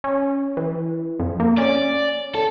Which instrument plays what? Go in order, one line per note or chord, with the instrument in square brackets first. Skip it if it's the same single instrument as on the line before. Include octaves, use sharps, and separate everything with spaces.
[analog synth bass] C#4
E3
F2
A#3
[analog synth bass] C#4 [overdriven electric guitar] D5
[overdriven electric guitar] A4